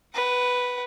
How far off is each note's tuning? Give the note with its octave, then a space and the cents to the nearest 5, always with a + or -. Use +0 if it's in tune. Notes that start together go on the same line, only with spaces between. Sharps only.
B4 +0 F#5 +30